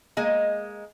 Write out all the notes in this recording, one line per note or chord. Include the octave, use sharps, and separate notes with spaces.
G#3 A#3 D#5 G#5